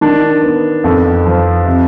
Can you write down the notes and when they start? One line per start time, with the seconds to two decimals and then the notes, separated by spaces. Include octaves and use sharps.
0.01 D#3 D4
0.42 B3
0.84 F2
1.26 F3
1.66 C3